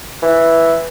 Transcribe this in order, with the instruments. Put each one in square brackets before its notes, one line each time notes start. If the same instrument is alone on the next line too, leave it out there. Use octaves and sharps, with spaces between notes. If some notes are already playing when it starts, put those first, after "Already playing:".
[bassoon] E3